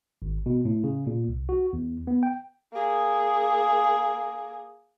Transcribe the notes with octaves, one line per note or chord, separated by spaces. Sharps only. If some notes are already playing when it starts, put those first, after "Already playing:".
G#1
B2
A2
C#3
A#2
C2
F#4
E2
B3
G5
A#3 G#4